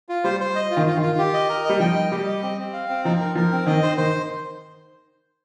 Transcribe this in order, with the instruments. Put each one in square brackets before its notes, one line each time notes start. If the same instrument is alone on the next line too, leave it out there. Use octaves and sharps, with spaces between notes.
[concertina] F4
[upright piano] G3 [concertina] C5
[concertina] C5
D#5
F4
[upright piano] D#3
[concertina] F4
[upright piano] D#3 [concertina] F4
[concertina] G4
D#5
A#4
[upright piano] G3 [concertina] D#5
[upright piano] F3 [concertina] G5
[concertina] D#5
[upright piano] G3 [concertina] G4
[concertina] D#5
C4
C4
F5
C4
[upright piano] F3 [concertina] D#4
[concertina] A#4
[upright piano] F3 [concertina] A#4
[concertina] C4
[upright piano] D#3 [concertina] D#5
[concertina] C5
[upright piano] D#3 [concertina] C5